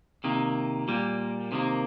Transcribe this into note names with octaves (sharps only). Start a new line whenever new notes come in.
C3 D#3 A#3
A#2 G3 A#3
C3 D#3 A#3